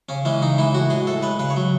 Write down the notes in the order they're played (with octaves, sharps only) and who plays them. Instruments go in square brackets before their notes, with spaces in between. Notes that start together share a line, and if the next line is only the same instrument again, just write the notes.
[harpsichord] C#3 C#4
E3 G#3 C#4
C#3 D#4
E3 G#3 E4
A2 F#4
G#3 G#4
A2 A4
G#3 B4
C#3 B4
C#5
F#3